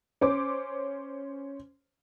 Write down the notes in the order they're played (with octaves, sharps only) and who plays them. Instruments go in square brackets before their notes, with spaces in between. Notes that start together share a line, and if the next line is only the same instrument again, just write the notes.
[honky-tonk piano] C#4 C5 D6